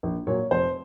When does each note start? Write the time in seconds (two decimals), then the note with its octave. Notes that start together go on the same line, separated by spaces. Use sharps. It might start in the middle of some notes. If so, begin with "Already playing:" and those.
0.03 A#1
0.27 A#2 F#3 C#5
0.51 F1 C5